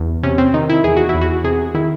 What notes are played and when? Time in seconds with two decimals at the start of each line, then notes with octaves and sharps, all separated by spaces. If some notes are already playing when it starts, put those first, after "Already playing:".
Already playing: E2
0.23 C3 C#4
0.38 C4
0.54 D#3 D#4
0.69 E4
0.84 E2 G#4
0.97 F#4
1.09 E4
1.14 E2
1.21 F#4
1.44 C3 G#4
1.75 D#3 E4